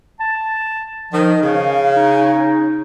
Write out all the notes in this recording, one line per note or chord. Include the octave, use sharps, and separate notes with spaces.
A5
D#3 F3
C#3 F5
D#4